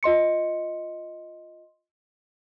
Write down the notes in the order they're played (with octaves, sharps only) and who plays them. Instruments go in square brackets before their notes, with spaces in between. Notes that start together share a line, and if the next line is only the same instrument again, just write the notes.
[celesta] F4 D#5 C6 C#7